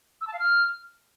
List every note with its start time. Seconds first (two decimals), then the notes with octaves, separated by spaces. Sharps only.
0.21 E6
0.27 A5
0.33 F5
0.40 F6